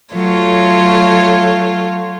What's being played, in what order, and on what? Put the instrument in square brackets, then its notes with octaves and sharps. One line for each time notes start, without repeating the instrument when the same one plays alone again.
[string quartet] F#3 A3 F4 C#5